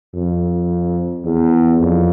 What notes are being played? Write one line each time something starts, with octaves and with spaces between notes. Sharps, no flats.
F2
E2
F2